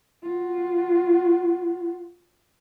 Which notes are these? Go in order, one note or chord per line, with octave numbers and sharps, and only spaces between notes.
F4 F#4